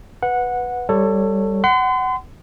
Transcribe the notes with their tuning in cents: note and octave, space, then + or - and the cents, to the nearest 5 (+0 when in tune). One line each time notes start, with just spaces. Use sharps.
B4 +0 F#5 -15
G3 +0 A4 +20 C#5 -10
F#5 +20 C6 -40